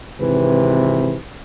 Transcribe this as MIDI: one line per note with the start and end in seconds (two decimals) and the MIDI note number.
0.20 1.15 32
0.20 1.15 48
0.20 1.15 52
0.20 1.15 71